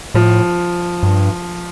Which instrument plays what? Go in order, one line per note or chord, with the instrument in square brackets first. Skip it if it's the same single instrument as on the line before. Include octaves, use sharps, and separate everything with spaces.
[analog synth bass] A2 [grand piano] F3
[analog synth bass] G2